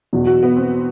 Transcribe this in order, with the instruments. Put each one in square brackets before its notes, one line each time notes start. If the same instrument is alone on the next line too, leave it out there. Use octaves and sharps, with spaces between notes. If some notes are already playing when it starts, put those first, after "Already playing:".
[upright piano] E2 B2 F#3
[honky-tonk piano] F#4
B3
C4